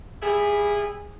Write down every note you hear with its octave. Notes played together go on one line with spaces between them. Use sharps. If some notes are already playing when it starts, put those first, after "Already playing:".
G3 E4 G#4